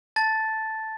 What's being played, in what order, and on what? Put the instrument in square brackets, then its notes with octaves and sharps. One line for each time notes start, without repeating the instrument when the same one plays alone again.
[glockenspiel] A5 A6